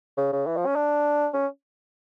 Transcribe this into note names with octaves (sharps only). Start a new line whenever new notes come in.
C#3
C#3
E3
F3
C#4
D4
C#4